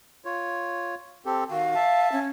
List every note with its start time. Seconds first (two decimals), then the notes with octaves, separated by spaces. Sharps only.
0.25 F4 C#5
1.26 C4 G4 A4
1.51 D#3 F#4 F5
1.75 E5 A5
2.12 C#4